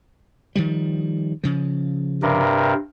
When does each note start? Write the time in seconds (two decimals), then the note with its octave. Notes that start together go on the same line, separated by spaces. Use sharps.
0.56 D#3 F3 G3
1.44 C#3 F3
2.22 G2 C3 A#4